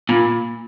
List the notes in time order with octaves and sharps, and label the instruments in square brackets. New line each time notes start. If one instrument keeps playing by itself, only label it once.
[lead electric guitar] A#2 [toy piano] F4